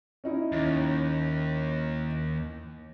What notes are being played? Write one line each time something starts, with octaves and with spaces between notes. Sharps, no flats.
C#4 D#4 E4
D#2